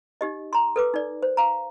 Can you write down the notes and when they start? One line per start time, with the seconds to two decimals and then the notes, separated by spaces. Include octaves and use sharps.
0.21 D#4 G4 D#5
0.53 A#5 C6
0.76 A4 B4 D6
0.94 D#4 D5
1.23 C5
1.37 F5 A#5